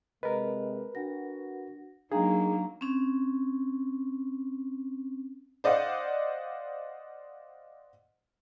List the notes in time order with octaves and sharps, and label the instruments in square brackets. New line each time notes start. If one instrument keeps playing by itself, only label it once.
[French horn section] C3 G#3 [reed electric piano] A#4 B4 [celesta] D#5
[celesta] D4 F#5 A#6 [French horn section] F#4
[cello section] F#3 A#3 [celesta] D4 F5 A#5 [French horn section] D#4 [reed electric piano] G#4
[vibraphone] C4 C#4
[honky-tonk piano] C5 D5 D#5 F5 F#5